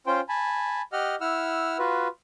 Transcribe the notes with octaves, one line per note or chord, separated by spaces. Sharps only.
C#4 F4 C5 G5
G#5 A5 B5
G4 D#5 F#5 F6
E4 F#5 E6 F6
F4 F#4 B4